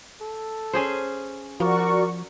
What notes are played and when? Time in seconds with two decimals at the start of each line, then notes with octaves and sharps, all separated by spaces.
0.21 A4
0.73 C#4 G#4 C5
1.60 F3 F#4 A#4 D5 C#6